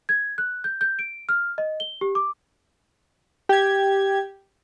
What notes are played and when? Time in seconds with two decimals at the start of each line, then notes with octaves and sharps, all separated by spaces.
0.09 G#6
0.38 F#6
0.64 G6
0.81 G6
0.99 D7
1.29 F6
1.58 D#5
1.80 G7
2.01 G4
2.15 D6
3.49 G4 G#6